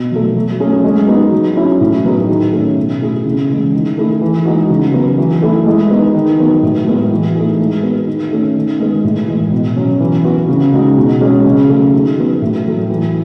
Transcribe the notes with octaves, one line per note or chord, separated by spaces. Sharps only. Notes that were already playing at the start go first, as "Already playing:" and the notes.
Already playing: B2
F#3 A3
F#3
A3 C#4 G#4
G#3
B3 D#4 F#4
F#3
C#4 E4
A2
F#3 B3 D#4 G#4
D#3
A3 C#4
B2
A3 E4 G#4
C#3
E3 G#3
D#3
A3 E4 G#4
E3
G#3 D#4 F#4
C#3
F#3 B3 F#4
E3
A3 E4
G#3
B3 D#4
D#3
F#3 B3
A2
G#3 B3 F#4
E3
A3 D#4 G#4
G#3
B3 F#4
D#3
A3 C#4
D#3
G#3 B3
A2
E3 G#3
B2
F#3 C#4 F#4
E3
B3 F#4
C#3
G#3 D#4 F#4
B2
G#3 C#4 G#4
C#3
F#3 A3
D#3
F#3 B3 F#4
A2
F#3 A3
E3